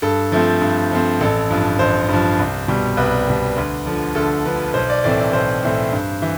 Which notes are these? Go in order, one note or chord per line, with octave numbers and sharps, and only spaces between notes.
G2 A4
F3 A3 C4
G2
F3 A3 C4
A1 A4
G2 F3
A1 C5
G2 F3
C2
B2 G3
C2 B4
B2 G3
D2
D3 F3
D2 A4
D3 F3 B4
B1 C5
D5
A2 E3 A3 C4 D5
D5
B1 C5
A2 E3 A3 C4
G2
E3